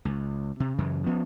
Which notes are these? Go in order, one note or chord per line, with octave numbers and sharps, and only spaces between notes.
C#2
C3
F#2 C#3 E3
F3 B3 C#4